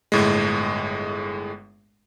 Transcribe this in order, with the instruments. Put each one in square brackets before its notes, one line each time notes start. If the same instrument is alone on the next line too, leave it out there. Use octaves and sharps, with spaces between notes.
[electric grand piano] G1 A2 G#3